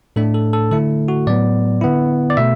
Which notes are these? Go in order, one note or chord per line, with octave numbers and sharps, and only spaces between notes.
A2 A3 D4 A4
A4
A4
D3 A3 E4 A4
F#4
A2 F#3 B3 D5
D3 B3 E4
D5
B2 A3 E5